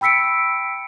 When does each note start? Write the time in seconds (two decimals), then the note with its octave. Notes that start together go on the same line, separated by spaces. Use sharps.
0.01 G5 B5 E6 B6 C#7 D7